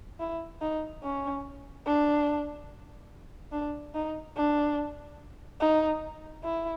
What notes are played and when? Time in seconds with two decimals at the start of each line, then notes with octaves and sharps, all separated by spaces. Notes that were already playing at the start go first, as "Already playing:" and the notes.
0.20 E4
0.62 D#4
1.03 C#4
1.86 D4
3.52 D4
3.94 D#4
4.36 D4
5.60 D#4
6.43 E4